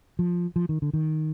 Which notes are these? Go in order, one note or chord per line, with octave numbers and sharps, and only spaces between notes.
F3
F3
D#3
D3
D#3